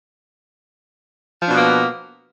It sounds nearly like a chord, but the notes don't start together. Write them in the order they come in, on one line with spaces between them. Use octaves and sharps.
F3 D4 B2 B3 A#3